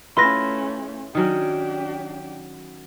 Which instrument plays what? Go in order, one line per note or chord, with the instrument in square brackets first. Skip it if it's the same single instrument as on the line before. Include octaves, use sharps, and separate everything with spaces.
[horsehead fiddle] A3 C#4 [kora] E4 F4 B4 [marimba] B5 [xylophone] C6 A#6
[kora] D#3 F#3 C#4 [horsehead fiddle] D4 G4